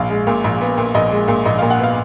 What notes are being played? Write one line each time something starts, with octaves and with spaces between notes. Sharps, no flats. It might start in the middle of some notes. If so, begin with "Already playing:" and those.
Already playing: A#1 F5
G#3
A#2
A#1
B3
A#2
A#1 D#5
G#3
A#2
A#1 D#5
A#2 F5
F#5
B3 F5